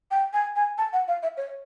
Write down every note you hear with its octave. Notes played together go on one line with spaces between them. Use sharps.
G5
G#5
G#5
A5
F#5
F5
E5
C#5